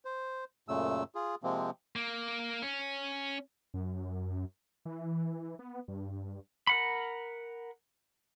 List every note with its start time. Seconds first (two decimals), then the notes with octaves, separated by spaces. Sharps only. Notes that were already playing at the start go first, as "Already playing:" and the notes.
0.05 C5
0.68 F#2 A#2 C#3 A3 E6
1.15 F4 G#4
1.43 C3 F3 G#3 A#3 C4
1.96 A#3
2.62 C#4
3.74 F#2
4.85 E3
5.59 B3
5.88 G2
6.67 A#4 F#5 B5